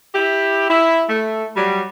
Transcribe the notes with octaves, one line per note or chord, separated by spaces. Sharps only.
E4 G4
E4
A3
F#3 G3